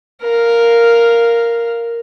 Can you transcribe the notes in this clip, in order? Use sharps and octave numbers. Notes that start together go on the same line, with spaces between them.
A#4 F5